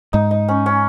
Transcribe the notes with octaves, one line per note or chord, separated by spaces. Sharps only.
G#2 D#4
D#4
C#4
C#4